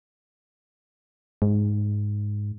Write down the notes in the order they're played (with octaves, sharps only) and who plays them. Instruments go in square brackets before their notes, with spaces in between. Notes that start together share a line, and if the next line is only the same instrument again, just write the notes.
[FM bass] G#2